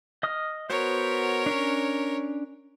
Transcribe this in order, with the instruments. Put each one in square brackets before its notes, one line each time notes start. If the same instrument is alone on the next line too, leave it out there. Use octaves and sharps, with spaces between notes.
[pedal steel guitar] D#5 D#6 F6
[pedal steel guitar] B3 F#4 C5 [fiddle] A#4 C#5
[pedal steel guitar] C#4 D4